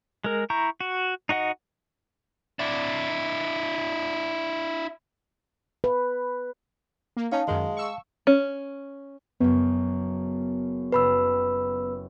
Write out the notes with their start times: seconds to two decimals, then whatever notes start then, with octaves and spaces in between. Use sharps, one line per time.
0.24 G#3 A#4
0.50 E4 A#5 C#6 G6
0.81 F#4
1.29 D#4 F#4 D#5 F#5
2.59 D4 E4
5.84 B4
7.17 A#3
7.32 C#4 D#4 F5 A5
7.48 F#2 D#3 G#3
7.77 C#6 E6
8.27 C#4
9.40 F#1 F#2 B3
10.92 F#1 G4 A4 B4 B5 E6